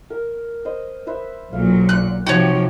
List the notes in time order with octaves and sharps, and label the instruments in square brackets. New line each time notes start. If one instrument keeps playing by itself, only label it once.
[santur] A#4
C5 D#5
B4 C5 E5
[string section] B1 A#2 F#3 [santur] F5
[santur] D4 [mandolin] F#6
[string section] C3 F3 G4 [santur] D#4 [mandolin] F#4 C#5